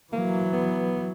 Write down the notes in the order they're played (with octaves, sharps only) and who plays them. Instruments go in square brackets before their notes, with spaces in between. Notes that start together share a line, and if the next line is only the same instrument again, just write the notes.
[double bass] E3 F#3 [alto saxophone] A#3
[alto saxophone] B3